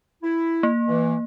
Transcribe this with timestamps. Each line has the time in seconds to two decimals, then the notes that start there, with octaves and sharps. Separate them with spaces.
0.23 E4
0.63 A#3
0.88 E3